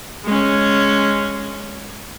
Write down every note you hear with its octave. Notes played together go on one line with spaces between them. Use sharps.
G#3 C#4